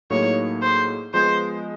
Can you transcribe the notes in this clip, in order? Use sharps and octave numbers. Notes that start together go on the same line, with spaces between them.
A2 F#3 A#3 D#4 G#4 C#5
C5
F3 G#3 B3 C5